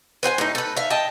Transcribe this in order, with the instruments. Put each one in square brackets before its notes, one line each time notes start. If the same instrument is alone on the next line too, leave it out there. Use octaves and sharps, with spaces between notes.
[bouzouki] B4 C5 F#5 G#5
A2 D#4
A4 B4
E5 F5
D#5 G5 A5